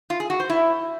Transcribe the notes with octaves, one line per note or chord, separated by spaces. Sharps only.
F4
G#4
F#4
C5
E4